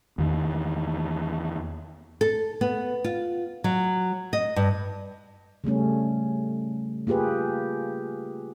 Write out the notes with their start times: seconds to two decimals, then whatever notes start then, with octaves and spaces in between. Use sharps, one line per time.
0.18 E2 D#3 E3
2.21 A4
2.61 B3
3.04 F4
3.64 F#3
4.33 D#5
4.56 G2
5.64 C#3 G3 A3 C#4
7.07 A#3 F4 G4 G#4 B4